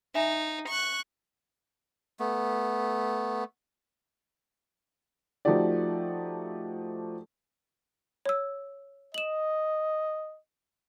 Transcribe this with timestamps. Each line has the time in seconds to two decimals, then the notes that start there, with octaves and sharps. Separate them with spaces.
0.15 D#4 E5 G#5 B5
0.69 C#6 F#6
2.20 A3 B3
5.45 F3 A3 D#4 F#4 G4 D5
8.25 C#5 E6
9.14 D#5 E7 F#7